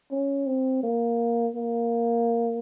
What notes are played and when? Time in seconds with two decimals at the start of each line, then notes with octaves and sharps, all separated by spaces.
0.11 C#4
0.47 C4
0.83 A#3
1.55 A#3